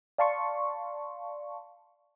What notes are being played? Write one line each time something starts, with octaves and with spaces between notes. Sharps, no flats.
D5 F5 A5 C6 C#6